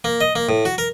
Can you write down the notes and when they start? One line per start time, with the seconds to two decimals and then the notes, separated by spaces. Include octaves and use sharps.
0.04 A#3
0.21 D#5
0.35 A#3
0.49 A2
0.65 F#4
0.78 A#4